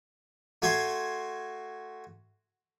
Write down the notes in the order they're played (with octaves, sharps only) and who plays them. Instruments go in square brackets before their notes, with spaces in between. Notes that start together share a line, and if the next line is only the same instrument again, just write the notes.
[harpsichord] A3 F#4 G#5 C6